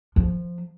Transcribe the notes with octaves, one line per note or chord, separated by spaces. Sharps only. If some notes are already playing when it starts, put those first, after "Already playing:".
F3